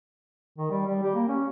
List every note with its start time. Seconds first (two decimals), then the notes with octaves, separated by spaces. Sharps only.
0.58 D#3
0.71 G3
0.87 G3
1.03 G4
1.15 A#3
1.28 C#4